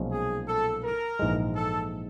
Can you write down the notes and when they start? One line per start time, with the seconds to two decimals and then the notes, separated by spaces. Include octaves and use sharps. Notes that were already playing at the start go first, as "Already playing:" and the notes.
Already playing: B1 A#2 F3 G#3 C#4
0.12 G#4
0.48 A4
0.84 A#4
1.19 A#1 G#2 E3 G#3
1.56 A4